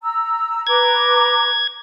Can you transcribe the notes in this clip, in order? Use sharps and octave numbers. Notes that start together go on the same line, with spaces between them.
A#5 E6
B4 A#5 D6 G#6